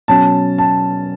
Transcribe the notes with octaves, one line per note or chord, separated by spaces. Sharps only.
B2 F#3 C#4 A5
A5